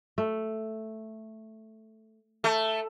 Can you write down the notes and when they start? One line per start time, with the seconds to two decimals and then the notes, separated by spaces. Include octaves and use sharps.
0.18 A3
2.44 A3